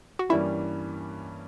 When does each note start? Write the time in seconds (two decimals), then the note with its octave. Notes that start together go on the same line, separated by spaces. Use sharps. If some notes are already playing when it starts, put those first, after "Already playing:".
0.19 F#4
0.29 G2 E3 G3 A#3 C#4 E4